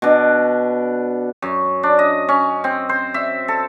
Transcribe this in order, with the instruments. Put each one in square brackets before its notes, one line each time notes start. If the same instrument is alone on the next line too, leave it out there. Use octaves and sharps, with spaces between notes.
[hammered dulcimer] B2 D4
F#2
D4
D#5
C#4
C4
C5
E5
A4